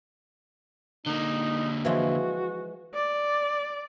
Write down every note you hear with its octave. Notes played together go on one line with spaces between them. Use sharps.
D3 A#3 D#4
E3 F3 G#3 F#4
D5